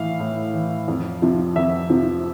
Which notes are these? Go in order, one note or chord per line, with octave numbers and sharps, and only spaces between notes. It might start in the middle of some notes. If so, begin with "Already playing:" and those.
Already playing: A2 E3 F5
A2
E3
F2
C3 F3
F2 E5
C3 F3